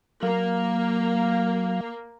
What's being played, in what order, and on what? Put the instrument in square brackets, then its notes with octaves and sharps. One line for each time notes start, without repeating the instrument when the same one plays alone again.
[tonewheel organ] F#3 F5 [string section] A#3